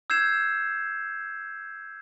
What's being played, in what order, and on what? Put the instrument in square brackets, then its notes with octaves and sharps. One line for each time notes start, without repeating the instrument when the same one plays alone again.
[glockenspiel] E6 G6 G#6 C7 E7